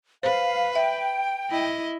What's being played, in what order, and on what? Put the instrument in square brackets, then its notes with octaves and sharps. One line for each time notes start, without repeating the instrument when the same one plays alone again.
[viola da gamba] B4 [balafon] C5 [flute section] F5
[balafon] E5 [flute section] G5
[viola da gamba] E4 D#5